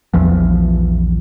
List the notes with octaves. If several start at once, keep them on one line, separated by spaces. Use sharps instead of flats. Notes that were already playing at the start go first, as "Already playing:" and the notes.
A#1 E2 E3 F3